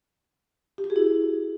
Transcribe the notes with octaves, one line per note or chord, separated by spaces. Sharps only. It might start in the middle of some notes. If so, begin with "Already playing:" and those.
G4
F#4
G#4
E4